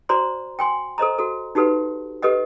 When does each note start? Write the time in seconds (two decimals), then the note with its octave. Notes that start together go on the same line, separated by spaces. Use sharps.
0.09 F#4 C5 D5 A#5 C6
0.59 G5 G#5 C6
0.98 A4 C5 D#5 A#5
1.19 F#4 A4
1.55 D#4 F#4 G4 A4 B4 F#5
2.22 G4 A4 B4 D#5 F#5